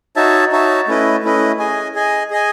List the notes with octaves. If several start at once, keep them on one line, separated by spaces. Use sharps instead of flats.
D#4 F#4 C#5 E5 A5
D#4 F#4 C#5 E5 A5
A3 C#4 E4 B4 D#5
A3 C#4 E4 B4 D#5
G#4 D#5 G#5
G#4 D#5 G#5
G#4 D#5 G#5